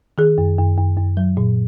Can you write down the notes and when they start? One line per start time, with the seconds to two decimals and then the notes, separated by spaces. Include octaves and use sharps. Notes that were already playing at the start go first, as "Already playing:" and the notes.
0.18 D#3 G#4
0.38 F#2
0.58 F#2
0.78 F#2
0.98 F#2
1.17 F#3
1.37 A#2